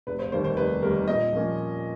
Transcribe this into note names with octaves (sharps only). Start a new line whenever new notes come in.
F1 B4
C5
D#2 D#3 G3 A#3 C5
C5
F1 B4
D#2 D#3 G3 A#3 A#4
A#2 D#5
F3 A#3 C#4